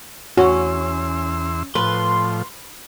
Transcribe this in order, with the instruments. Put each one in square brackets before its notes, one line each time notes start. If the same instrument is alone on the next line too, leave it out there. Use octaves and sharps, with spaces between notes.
[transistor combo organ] E2 C6 E6 [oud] C#4 [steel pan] F#4
[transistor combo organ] A2 F3 [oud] B4 [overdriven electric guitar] C6